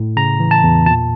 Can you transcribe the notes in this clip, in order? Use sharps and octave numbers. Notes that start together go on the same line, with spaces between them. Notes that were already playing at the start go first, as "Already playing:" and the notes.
Already playing: A2
C#3 A#5
E3
A5
E2
A#2 A5